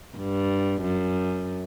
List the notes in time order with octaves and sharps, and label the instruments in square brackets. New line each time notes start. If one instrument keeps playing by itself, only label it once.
[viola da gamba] G2
F#2